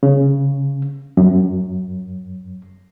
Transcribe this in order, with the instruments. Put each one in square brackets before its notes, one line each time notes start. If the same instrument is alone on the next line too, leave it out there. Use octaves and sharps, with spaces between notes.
[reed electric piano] C#3
F#2